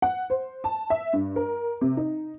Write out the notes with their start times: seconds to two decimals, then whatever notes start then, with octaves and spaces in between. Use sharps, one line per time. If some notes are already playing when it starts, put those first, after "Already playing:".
0.02 F#5
0.30 C5
0.64 A5
0.90 E5
1.13 G2
1.36 A#4
1.81 C3
1.97 D#4